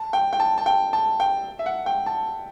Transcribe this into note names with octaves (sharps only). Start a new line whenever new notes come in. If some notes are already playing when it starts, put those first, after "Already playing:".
Already playing: A5
G5
G5
A5
A5
G5
A5
G5
E5
F#5
G5
A5